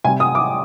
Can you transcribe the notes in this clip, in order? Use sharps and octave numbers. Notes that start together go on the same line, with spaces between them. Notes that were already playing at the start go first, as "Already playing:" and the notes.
C3 G3 G#5
D#6
D6